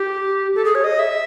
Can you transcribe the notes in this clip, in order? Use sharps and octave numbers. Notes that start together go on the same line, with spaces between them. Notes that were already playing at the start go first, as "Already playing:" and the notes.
Already playing: G4
A4
G#4
C#5
D#5
E5